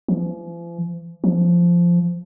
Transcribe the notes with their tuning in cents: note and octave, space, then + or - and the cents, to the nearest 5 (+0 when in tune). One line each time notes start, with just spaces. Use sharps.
F3 -45
F3 -10